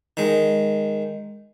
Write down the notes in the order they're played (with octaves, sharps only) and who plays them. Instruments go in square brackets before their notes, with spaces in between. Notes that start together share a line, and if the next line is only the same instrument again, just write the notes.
[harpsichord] D#3 G#3